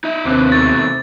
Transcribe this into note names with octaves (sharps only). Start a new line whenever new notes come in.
D#4 E5
D#2 C3 A#3 D4 B4
B2 D#3 A3 A6